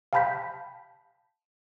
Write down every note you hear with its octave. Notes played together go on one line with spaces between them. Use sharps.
F5 G5 A5 B5 G6 B6